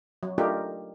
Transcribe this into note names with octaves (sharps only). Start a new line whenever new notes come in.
F#3
A3 D4 D#4 F4 G4 A#4